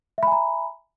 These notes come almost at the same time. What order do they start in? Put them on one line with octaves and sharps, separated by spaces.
E5 B5 G#5 A#5